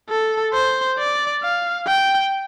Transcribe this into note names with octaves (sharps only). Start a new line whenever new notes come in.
A4
C5
D5
F5
G5